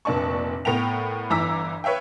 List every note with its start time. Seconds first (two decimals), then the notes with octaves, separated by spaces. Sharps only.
0.05 F1 A#2 D4 A5 C#6
0.65 A2 B3 A#4 G5 F7
1.30 G1 E3 A#5 D6 E6 B6
1.84 B4 C#5 E5 F5 G5